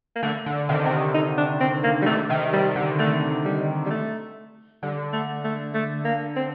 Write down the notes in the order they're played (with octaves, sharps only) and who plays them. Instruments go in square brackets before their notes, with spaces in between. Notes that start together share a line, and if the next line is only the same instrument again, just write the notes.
[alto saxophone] A#3
[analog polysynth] D3 [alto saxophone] A3
[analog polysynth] D3
C3 D#3
[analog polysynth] D#3 [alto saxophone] C4
[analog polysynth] D3
[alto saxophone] D#4
D4
C4
A#3
G3
[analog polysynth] C3 D#3 [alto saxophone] A3
[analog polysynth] C3 D#3
[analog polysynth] C3 [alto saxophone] G3
[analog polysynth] D3
[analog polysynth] D3 [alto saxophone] A3
[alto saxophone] G3
G3
A3
[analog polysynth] D3 [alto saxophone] G3
[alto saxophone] A3
A3
A3
A#3
C4